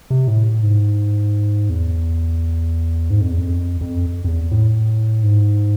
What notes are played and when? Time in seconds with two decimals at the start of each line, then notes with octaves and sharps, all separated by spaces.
0.10 C3
0.27 A2
0.63 G#2
1.69 E2
3.10 G#2
3.21 F2
3.30 E2
3.39 F2
3.81 F2
4.24 F2
4.28 E2
4.51 A2
5.23 G#2